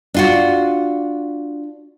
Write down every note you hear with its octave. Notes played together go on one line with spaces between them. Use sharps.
D4 F4 F#4